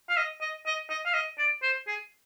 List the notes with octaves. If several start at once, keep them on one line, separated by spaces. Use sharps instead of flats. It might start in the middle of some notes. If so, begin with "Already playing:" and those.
F5
D#5
D#5
D#5
D#5
F5
D#5
D5
C5
G#4